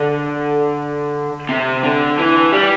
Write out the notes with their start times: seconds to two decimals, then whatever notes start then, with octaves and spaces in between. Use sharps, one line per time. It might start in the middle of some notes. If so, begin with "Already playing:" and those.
Already playing: D3
1.49 C3
1.83 D3
2.19 E3
2.52 G3